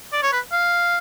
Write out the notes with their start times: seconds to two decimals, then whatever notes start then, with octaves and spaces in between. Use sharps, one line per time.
0.13 D5
0.23 C#5
0.33 B4
0.52 F5